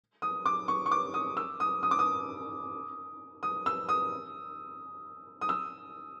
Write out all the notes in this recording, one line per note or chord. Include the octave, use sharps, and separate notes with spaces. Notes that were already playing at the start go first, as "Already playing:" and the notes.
D#6
D6
C#6
C#6
D6
D#6
E6
D#6
D#6
D6
D#6
D#6
E6
D#6
D#6
E6